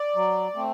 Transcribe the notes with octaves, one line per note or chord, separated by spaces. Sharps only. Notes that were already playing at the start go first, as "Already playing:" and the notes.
Already playing: D5
F#3
A3 C4